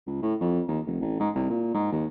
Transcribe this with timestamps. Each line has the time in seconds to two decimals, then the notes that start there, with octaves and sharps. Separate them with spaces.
0.06 C#2
0.22 A2
0.40 F2
0.68 D#2
0.86 F1
1.01 A1
1.19 G#2
1.35 C2
1.50 A#2
1.74 G#2
1.92 D#2